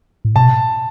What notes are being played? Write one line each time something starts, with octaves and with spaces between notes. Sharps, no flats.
A2
B2 A5